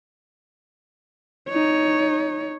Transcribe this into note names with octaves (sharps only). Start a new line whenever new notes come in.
D#4 C#5